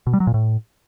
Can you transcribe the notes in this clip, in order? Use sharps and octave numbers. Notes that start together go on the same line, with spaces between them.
B2
G3
F#3
A#2
A2